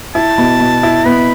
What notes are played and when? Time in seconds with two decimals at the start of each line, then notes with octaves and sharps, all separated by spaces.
0.15 E4 A5
0.38 B2
0.60 B2
0.83 E4
1.05 B3 B5